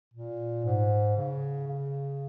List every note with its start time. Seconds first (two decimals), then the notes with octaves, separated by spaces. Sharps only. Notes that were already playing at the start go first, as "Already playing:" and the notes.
0.14 A#2
0.65 G#2
1.16 C#3
1.67 C#3